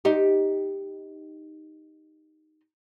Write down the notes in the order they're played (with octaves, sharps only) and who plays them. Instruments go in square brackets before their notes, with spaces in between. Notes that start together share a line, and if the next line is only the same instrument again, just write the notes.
[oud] D#4 G4